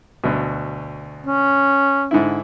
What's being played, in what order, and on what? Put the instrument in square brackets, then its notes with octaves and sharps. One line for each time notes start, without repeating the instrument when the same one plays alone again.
[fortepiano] D2 B2
[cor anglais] C#4
[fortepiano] G#2 D3 E4